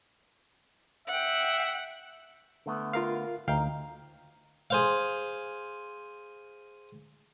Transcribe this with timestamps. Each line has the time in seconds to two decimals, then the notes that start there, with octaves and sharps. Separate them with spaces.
1.08 E5 F#5 G5
2.66 D3 A3 B3
2.93 F4 A#4 F5
3.48 D2 D#4 F5 G5
4.70 G#4 C5 F5